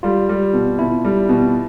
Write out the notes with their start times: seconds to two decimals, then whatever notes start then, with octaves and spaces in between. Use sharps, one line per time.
0.03 G3 F4
0.29 G3
0.53 B2
0.79 B2 E4
1.05 G3
1.29 B2